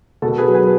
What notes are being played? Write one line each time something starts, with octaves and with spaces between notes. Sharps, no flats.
B2 A4
G#4 B4
F#3
G#4 B4